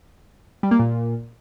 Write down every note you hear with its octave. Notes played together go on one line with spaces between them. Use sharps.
G3
A#3
A#2